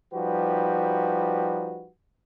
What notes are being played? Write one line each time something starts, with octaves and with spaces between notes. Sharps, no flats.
F3 G3 D#4 F#4 G4 B4